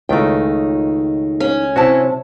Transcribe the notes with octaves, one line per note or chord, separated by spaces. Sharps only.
C#2 D#3 A3 D#4 G5
C#4
C3 E4 F#4 C#5 A5